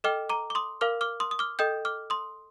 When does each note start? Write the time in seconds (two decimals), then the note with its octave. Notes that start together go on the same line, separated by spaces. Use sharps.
0.04 A4 D#5 G5 D6 F6
0.30 A#5 D6
0.50 D6
0.55 C6 D#6
0.81 A#4 F5 D6 F6
1.01 D6 F6
1.20 C6 D#6
1.31 D#6
1.39 D6 F6
1.59 A4 D#5 G5 D#6 G6
1.85 D6 F6
2.10 C6 D#6